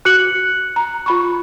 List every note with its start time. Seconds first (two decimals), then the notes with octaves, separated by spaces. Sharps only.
0.05 F#4 F#6 C#7 F#7
0.76 A#5
1.06 F4 B5 C#6